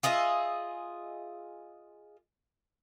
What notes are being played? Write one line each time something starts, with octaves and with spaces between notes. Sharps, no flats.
F4 G#4 D#5 E5